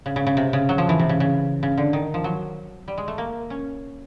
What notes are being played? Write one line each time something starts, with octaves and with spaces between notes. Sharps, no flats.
C#3
C#3
C#3
C3
C#3
F#3
F3
E3
C3
C#3
C#3
C#3
D3
D#3
F3
F#3
G3
G#3
A3
A#3
C#4